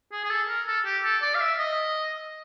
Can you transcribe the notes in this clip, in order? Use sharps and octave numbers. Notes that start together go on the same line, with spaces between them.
G#4
G#4
A4
A#4
A4
G4
A4
D5
F5
E5
D#5